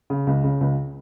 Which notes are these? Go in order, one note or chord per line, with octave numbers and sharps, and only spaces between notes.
C#3
C#2
C#3
C#2